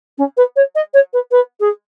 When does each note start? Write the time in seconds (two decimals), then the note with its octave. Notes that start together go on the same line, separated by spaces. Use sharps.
0.18 C#4
0.37 B4
0.56 C#5
0.75 D#5
0.93 C#5
1.13 B4
1.31 B4
1.60 G#4